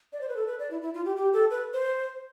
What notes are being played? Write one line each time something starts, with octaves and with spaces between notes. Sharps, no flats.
D5
C5
B4
A4
B4
D5
E4
E4
F4
G4
G4
A4
B4
C5